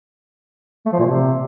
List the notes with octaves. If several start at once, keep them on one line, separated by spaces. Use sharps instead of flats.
A3
F3
A#2
C3